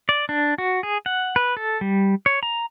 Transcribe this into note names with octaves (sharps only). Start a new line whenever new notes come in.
D5
D4
F#4
G#4
F#5
B4
A4
G3
C#5
A#5